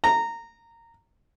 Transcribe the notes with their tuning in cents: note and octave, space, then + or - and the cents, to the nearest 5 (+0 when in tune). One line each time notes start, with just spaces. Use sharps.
A#5 -15